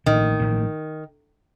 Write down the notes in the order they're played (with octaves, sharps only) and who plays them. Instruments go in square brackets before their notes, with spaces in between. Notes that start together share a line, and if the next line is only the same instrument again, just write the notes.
[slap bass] A1 A2 F3 A#3 [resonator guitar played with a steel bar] D#3
[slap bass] A1 A2 F3 A#3